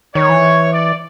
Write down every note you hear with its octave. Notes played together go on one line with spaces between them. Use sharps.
D#3 C#5
E3
D5